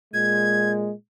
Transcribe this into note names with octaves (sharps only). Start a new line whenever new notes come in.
A#2 G#3 G#6